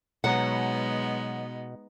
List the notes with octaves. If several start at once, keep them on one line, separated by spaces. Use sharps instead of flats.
B2 F#3 G#3 B3 D#4 F#5